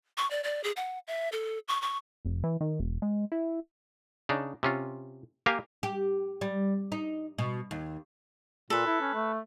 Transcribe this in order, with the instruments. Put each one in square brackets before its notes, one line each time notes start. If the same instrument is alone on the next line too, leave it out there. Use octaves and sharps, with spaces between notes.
[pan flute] C#6
D5
D5
G#4
F#5
E5
A4
C#6
C#6
[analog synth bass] F1
E3
D#3
E1
G#3
E4
[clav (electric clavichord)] C#3 D4 D#4
C3 C#4 F4
A#3 G4 A#4 F5 G#5 A#5
[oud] G4
G3
D#4
B2
D#2
[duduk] A#2 [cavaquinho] A4 B4
[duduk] E4
C#4
A3